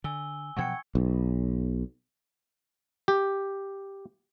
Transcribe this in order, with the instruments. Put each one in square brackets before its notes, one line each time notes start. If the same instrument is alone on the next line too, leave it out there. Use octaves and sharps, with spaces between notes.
[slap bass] D3 [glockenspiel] G#5 E6 G7
[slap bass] B2 F3 F#3 [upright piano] F#5 G5 [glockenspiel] C#6 G#6 C#7
[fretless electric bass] B1
[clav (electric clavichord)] G4